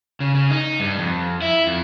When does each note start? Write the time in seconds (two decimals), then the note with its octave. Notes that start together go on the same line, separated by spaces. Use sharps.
0.20 C#3
0.35 C#3
0.51 D#4
0.80 G2
0.99 F2
1.42 E4
1.67 F2